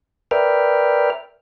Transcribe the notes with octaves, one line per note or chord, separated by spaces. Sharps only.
A#4 B4 D5 E5 G5 F6